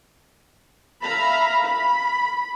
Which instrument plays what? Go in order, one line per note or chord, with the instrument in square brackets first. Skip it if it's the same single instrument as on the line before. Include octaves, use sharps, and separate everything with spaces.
[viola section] E5 F5 A#5 B5
B5